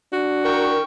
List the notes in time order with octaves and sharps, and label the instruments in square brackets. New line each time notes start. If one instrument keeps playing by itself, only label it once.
[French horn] D4 [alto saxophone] F#4
[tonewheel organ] A#4 [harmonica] G5 C#6